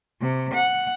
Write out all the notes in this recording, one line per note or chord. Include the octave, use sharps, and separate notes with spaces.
C3
F#5